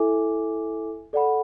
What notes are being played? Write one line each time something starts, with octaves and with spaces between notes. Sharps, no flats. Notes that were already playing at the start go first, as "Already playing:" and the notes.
Already playing: E4 A4 E5 G#5 D6
A4 D5 F#5 B5